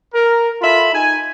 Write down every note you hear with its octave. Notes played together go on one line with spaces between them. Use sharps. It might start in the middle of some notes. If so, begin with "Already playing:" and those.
A#4
F4 A4 E5 B5
D#4 G#5